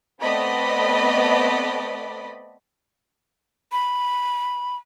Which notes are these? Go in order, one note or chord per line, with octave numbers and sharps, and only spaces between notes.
A3 B3 C4 D5 D#5 B5
B5